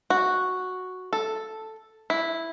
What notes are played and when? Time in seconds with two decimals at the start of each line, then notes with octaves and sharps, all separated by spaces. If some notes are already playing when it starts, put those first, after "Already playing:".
0.10 F#4
1.13 A4
2.10 E4